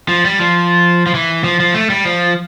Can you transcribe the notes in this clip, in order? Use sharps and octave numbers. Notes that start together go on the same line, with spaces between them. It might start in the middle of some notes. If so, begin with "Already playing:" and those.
F3
G3
F3
F3
E3
F3
F3
A3
G3
F3